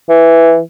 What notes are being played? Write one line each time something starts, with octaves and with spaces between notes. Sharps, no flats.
E3